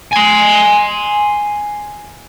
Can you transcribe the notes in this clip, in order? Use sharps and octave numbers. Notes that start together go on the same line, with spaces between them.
G#5 C6